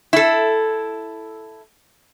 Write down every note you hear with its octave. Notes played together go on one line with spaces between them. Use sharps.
E4 A4